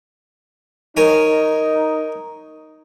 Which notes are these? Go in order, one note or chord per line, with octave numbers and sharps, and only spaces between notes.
D#4 A#4 C#5 G#5